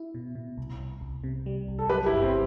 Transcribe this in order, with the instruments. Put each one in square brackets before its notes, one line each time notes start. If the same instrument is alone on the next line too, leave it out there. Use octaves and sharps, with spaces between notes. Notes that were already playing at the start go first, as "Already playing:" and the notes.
Already playing: [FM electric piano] E4
B2
B2
C2
C2
C2
C3
G3
C2
[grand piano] A4
[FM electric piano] F#3 [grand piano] G4 B4
[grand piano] E4 G4
[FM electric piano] G1
[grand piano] C4